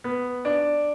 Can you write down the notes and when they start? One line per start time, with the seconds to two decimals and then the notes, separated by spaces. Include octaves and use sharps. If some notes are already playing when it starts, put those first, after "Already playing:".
0.04 B3
0.45 D4